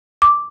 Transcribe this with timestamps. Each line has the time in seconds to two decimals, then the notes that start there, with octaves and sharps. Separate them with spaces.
0.22 D6